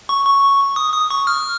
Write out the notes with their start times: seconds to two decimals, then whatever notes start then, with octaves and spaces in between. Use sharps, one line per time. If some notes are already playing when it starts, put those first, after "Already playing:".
0.09 C#6
0.25 C#6
0.76 D#6
0.93 D#6
1.11 C#6
1.27 F6